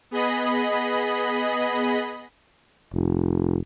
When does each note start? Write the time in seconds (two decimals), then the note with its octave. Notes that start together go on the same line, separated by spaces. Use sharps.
0.11 B3 G#4 D#5 B5
2.94 F1